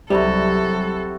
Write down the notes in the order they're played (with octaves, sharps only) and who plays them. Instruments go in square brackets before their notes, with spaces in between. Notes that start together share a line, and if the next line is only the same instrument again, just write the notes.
[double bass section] C2 F#3 [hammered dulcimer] C3 E4 F#4 [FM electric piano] G3 [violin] A4